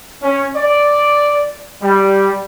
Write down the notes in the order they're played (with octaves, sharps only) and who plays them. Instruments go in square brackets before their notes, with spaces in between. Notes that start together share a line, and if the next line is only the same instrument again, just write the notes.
[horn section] C#4
D5
G3